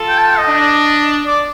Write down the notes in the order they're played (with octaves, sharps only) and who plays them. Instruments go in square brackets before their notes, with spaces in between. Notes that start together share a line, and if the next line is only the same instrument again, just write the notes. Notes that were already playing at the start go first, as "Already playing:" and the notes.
Already playing: [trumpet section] F4 A4
[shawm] G5
A5
G5
D#5
[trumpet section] D4
[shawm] D5